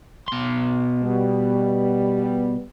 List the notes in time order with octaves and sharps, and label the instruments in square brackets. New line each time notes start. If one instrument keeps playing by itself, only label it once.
[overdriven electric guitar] B2 C6
[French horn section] G3 B3